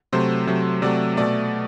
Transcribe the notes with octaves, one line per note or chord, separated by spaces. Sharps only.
C3 F#3 A3 C5
C3 F#3 A3
C3 F#3 A3 D5
B2 A3 D5